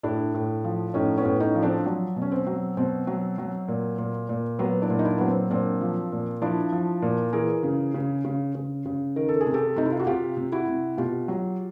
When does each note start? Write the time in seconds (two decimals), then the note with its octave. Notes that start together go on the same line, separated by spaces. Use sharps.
0.03 A2 D4 E4
0.34 A2
0.64 F3
0.94 A2 C#4 D#4
1.18 B3 C#4
1.24 A2
1.40 C#4 D#4
1.55 F3
1.62 C4 D4
1.86 F#3
2.16 B2
2.22 C#4
2.32 C4
2.47 F#3
2.77 B2 C4
3.07 F#3
3.38 F#3
3.68 A#2
3.98 A#2
4.29 A#2
4.59 F#3 B3
4.82 D4 E4
4.90 A#2
4.99 D#4
5.05 D4 E4
5.18 F#3 B3
5.28 C4
5.50 A#2 C4 D4
5.81 F3
6.12 A#2
6.41 F3 D4 E4
6.72 F3
7.02 A#2
7.33 E3 G#4 A#4
7.63 C#3
7.94 C#3
8.25 C#3
8.55 C#3
8.85 C#3
9.16 D#3 A#4
9.29 A4
9.41 G#4
9.46 C3
9.54 G4 A4
9.76 C3 D#4
9.85 E4
9.92 F4
9.99 F#4
10.06 C3 F4 G4
10.37 C3
10.52 E4 F#4
10.68 C3
10.97 B2 F4 G4
11.28 F#3